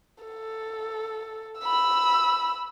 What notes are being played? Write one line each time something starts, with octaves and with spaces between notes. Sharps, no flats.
A4
B5 E6